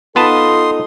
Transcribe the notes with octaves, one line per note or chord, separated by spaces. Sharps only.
B3 D#4 F4 A4 B4 A5 C6 D#6